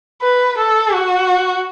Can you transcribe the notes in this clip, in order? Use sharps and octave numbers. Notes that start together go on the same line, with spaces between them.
B4
A4
F#4